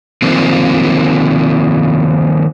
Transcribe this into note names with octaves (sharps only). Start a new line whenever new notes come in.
D#3 F3 A#3 C4